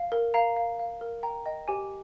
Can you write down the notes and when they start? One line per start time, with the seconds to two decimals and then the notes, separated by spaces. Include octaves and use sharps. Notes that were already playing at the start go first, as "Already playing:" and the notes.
Already playing: F5
0.12 A#4
0.34 F5 A#5
0.56 F5
0.79 F5
1.01 A#4
1.23 G5 A#5
1.46 D#5 G5
1.68 G4 G#5